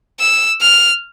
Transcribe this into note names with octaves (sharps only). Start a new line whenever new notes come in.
E6
F6